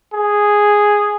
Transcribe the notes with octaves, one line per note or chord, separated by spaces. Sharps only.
G#4